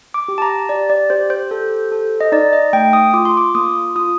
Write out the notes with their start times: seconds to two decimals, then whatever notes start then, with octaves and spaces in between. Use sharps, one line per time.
0.14 D6
0.28 G4
0.38 A5
0.42 A#5
0.69 G4 D5
0.90 D5
1.10 G4 C5
1.30 C5
1.51 A4
1.92 A4
2.21 D#5
2.32 D#4 D5
2.53 D#5
2.73 A3 G5
2.93 D#6
3.13 F4 D6
3.25 C6
3.37 D6
3.55 A#3 D#6
3.95 F4 D#6